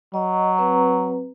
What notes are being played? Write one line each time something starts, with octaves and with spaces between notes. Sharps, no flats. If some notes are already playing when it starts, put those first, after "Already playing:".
F#3 D#5
C4 B4 A#5